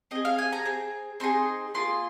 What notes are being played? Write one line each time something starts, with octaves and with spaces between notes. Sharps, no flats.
C4 G#4 D#5
F5
G#5
A#5
C4 G#4
C4 D#4 G#4 C6
A#3 F4 G#4 C6